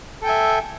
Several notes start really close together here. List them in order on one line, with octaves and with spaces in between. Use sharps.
A4 G5 G#5 E5